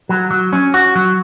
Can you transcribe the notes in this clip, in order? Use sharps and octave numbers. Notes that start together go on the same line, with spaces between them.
F#3
F#3
C#4
F#4
F#3